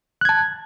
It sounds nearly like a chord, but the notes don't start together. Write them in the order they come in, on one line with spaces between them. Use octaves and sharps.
F#6 G#6 A5